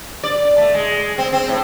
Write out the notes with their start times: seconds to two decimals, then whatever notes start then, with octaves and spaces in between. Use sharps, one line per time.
0.24 D5
0.58 A3
0.74 G#3
1.18 C4
1.33 C4
1.48 A2